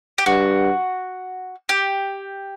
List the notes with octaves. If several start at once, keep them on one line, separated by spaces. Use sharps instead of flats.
G4
G2 F#4
G4